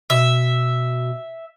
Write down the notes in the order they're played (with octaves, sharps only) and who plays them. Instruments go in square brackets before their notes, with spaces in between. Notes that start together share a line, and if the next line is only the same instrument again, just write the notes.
[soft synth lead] B2 [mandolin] E5